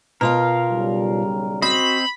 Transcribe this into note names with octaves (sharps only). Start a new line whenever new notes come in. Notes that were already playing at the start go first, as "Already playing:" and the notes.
B2 F4 A#4 F5
B1 C#3 G3
C4 F#4 C5 D#5 B5